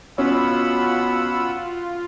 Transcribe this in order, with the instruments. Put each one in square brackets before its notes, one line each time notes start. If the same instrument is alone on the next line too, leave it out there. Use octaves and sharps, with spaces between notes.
[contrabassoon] B2 [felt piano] C#4 [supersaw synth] F4 [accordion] F#5 B5 E6